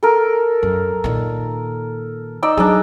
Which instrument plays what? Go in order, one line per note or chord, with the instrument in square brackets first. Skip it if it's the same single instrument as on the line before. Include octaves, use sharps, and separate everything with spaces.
[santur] A4 A#4
[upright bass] F#2
A#2 D#3
[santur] D#4 D5 E6
[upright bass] F#3 [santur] D4 D#4 G#4